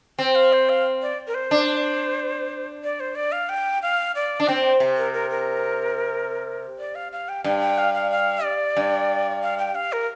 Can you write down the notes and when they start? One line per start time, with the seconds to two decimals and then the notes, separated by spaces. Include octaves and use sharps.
0.19 C4 G5
0.35 F5
0.53 C5
0.69 F5
1.02 D5
1.27 A#4
1.34 C5
1.51 D4
2.84 D5
3.00 C5
3.15 D5
3.32 F5
3.49 G5
3.82 F5
4.15 D5
4.40 D4
4.48 C4 G5
4.80 C3
4.98 A#4
5.13 A#4
5.30 A#4
6.79 D5
6.95 F5
7.12 F5
7.29 G5
7.44 G2 G5
7.62 G5
7.78 F5
7.94 F5
8.11 F5
8.44 D5
8.77 G2
9.42 F5
9.58 G5
9.75 F5
9.93 A#4